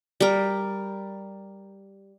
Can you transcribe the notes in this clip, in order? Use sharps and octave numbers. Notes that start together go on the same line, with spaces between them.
G3 A#4